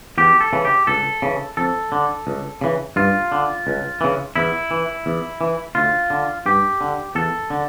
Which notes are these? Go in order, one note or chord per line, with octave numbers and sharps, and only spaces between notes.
E2 G4
A4
C#3 E3
G4
C#2 A4
C#3 E3
F2 A4
D3
C#2
C#3 E3
G2 F4
D3
C#2
C#3 E3
E2 E4
E3
E2
E3
D2 F4
D3
G2 G4
D3
E2 A4
D3